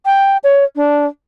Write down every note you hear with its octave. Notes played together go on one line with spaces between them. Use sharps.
G5
C#5
D4